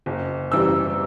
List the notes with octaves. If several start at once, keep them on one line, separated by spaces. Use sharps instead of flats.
F#1
F#2 E3 G3 E6